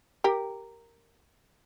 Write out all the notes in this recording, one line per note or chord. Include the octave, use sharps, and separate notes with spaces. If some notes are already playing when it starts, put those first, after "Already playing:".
G4 A#4